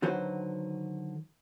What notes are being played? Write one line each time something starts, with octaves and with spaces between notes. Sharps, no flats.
D3 D#3 F#3 F#4 B4 C5